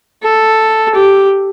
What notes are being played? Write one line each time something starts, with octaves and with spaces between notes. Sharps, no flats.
A4
G4